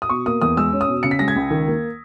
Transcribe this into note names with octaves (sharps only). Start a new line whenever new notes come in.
D#6
B2 C#6
A#3 D#6
E2 D#6
G#3 E6
C#4
D#6
B2
C#3 C#7
B6
G#3 A#6
G#6
C#2
D#3
A#3